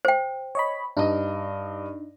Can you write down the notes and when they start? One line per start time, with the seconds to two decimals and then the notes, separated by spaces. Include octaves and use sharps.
0.05 C5 G5
0.55 C#5 D#5 B5
0.97 G2 D4 D#4 D#5